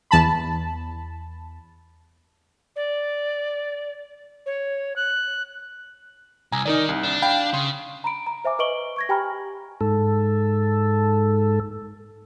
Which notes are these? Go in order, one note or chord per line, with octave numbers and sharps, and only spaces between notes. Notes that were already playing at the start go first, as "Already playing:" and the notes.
E2 A5 B5
D5
C#5
F#6
C2 G#5 A#5
D#3 D#4 A#4 D5
C2
D4
F5 G5 B5
C#3 C6
A#5 B5 D7
A#5
C5 E5 G#5 D6
B4 D#5 C#6 D7 F#7 G7
C#6 G#6 A#6
G4 G5 G#5 A#5 B5 F6
G#2 A4